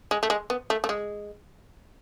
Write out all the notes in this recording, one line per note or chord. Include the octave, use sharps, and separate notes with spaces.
G#3
A3
G#3
B3
A3
A3
G#3